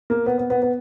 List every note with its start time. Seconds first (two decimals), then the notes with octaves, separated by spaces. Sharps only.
0.10 A#3
0.26 B3
0.38 B3
0.50 B3
0.62 B3